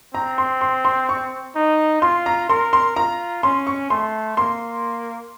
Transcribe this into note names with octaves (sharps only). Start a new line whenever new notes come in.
C4 A#5
C6
C6
C6
C#6
D#4
F4 C6
A#5
A#4 C6
C6
F4 A#5
C#4 C6
C#6
A3 C6
A#3 C6